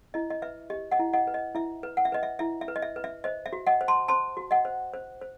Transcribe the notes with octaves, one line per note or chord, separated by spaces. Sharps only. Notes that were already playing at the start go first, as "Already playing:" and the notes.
E4 D#5
D#5
B4 E5
G4 D#5
D#5 F#5
E4
D#5 F#5
B4
D#5
E4 E5
B4
F#5
E5
B4 D#5
E5
E4 E5
E5
B4
D#5
E5
B4
E5
C5 D#5
E5
F#4
D#5 F#5
C5
A5 C6
C5 A5 C6
F#4
D#5 F#5
C5
C5
C5